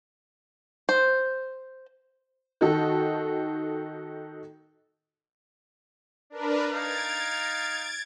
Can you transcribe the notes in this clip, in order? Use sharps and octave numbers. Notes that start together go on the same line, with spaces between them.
C5
D#3 D#4 F#4 A4
D4 A#4 B4
D#4 F5 A#5 G#6 A6 D7